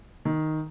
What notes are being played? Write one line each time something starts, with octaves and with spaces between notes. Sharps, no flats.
D#3